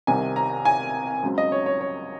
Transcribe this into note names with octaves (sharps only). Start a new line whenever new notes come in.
C2 C3 D#3 G#5
A#5
G#5
C#2 C#3 F#3 C4
D#5
C#5
C#5
C#5